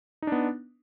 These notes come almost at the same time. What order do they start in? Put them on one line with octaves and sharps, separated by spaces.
D#4 D4 B3